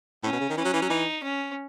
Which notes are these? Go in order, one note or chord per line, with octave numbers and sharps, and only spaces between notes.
A2 C#4
B2
C#3
D#3
E3 C#4
F#3
E3
F#3
E3 D#4
C#4